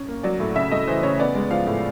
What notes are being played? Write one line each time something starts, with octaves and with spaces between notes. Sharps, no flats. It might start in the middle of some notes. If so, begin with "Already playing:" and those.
Already playing: C#4
A#3
F#3 D5
A2
C#3 E5
A3 D#5
E3 C5
C#3 C#5
B3 D5
G#3
F3 F5
A2